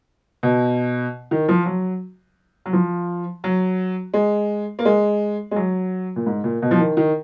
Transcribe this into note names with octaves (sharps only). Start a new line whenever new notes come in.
B2
D#3
F3
F#3
F#3
F3
F#3
G#3
A#3
G#3
G#3
F#3
A#2
G#2
A#2
B2
F3
D#3
D#3